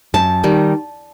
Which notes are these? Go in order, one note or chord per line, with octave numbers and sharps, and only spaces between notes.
F#2 A5
D#3 G3